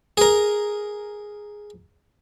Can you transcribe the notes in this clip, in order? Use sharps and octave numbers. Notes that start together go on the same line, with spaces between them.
G#4 A#4